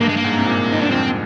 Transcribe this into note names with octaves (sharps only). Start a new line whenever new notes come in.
G2 A#3
G#3
A#3
G#2
C3
A#2
C3 D#4
D4
G2
F2 C4